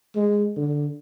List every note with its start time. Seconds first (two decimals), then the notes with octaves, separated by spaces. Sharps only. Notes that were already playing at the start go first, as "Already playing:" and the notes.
0.16 G#3
0.56 D3